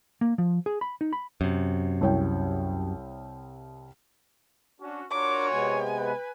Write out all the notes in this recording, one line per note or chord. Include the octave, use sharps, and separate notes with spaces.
A#3
F3
G#4
B5
D#4
B5
F#2 C3
C2 C#5 G5
C#4 D4 F#4
D4 F4 F#4 A#4 C#5 D6
C3 G#3 B3 G#5
B4